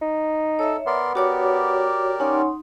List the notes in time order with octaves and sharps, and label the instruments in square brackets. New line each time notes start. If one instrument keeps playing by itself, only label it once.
[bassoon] D#4
[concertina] A4 [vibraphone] C#5 E5
[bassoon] B3 [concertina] A#4 D5 C6
[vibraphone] F#4 C#5 D6 [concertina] G4 A#4 D5
[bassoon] C#4 [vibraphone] D#4 F#5 C6